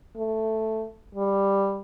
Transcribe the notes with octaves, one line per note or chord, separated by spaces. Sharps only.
A3
G3